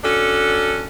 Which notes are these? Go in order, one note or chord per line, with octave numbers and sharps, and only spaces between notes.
C#4 D4 F#4 A4